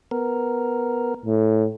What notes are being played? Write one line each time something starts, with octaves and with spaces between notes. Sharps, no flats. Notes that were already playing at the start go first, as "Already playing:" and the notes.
B3 A#4
A2